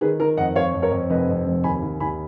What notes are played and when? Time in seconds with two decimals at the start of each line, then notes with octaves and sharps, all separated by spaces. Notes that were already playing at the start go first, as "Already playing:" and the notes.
0.01 D#3 G#4 B4
0.20 D#3 A#4
0.37 F2 D#5 F#5
0.55 F2 C#5 F5
0.74 F2
0.82 A#4 C#5
0.91 F2
1.10 F1 B4 D#5
1.29 F2
1.46 F1
1.64 D#2 G#5 B5
1.82 D#2
2.00 D#2 G#5 B5